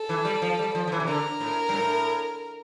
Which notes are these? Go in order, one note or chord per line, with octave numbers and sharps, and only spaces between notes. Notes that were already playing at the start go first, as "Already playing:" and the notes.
Already playing: A4
E3
G3
F3
G3
F3
F3
E3
C3
D3 A#4
A2
G2
A2